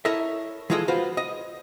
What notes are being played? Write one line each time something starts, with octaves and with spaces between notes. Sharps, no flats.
E4 A4 A#4 C#5 D#5 E5
E3 G#3 F4 G#4 A4 D#5
F4 F#4 B4 C5
D#5